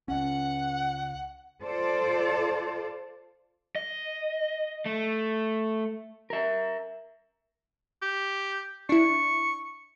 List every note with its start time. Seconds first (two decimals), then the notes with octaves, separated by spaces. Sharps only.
0.08 C#2 C#4 F#5
1.63 F4 A4 C5 D5
3.75 D#5
4.86 A3
6.30 A#4 E5
8.02 G4
8.89 D4 E4 C#6